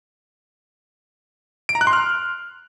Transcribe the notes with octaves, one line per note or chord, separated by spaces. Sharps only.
D7
A#5
F#6
C6
F6